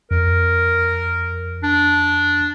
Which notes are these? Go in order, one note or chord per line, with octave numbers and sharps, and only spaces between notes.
F2 A#4
D4